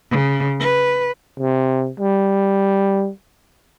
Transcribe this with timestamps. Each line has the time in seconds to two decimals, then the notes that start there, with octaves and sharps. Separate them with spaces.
0.11 C#3
0.60 B4
1.40 C3
2.00 G3